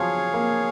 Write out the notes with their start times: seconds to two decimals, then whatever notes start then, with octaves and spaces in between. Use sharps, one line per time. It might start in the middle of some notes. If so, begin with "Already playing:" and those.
Already playing: F3 F#3 G#4 C#5 F5
0.34 A#3